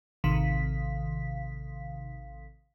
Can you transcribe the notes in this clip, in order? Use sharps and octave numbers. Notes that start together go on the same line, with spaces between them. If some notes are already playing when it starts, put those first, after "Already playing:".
A1 C3 D#3 F5 B6